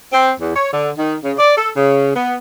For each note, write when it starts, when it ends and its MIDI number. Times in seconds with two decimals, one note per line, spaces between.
0.13 0.31 60
0.41 0.54 40
0.55 0.68 73
0.73 0.91 50
0.98 1.15 51
1.24 1.33 49
1.38 1.56 74
1.57 1.70 69
1.76 2.13 49
2.16 2.36 59